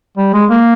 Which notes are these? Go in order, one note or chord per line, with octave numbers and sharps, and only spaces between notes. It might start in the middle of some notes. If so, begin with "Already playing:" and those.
G3
G#3
A#3